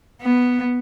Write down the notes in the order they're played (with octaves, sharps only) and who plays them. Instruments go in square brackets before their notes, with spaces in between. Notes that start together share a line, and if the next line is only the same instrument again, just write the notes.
[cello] B3